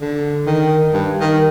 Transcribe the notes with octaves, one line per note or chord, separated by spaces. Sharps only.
D3
D#3
G2
D#3